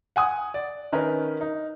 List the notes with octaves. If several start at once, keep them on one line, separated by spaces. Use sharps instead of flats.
F#5 G#5 D#6
D5
D#3 C#4 D#4 A#4 B4
D#4